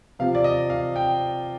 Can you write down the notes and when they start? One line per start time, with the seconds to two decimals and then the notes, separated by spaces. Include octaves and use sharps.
0.19 C3 F3 F5
0.35 D5
0.44 D#5
0.70 F5
0.96 G5